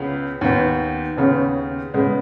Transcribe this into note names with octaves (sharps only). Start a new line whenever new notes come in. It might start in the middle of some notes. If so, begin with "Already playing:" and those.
Already playing: C#2 C#3 B3
D#2 D#3 B3
D#2 C#3 B3
C#3 G#3 B3